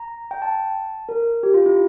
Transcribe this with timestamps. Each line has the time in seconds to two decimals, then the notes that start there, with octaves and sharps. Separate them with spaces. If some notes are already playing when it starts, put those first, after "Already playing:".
Already playing: A#5
0.31 G5
0.42 A5
1.09 A#4
1.43 G4
1.54 F4
1.66 E4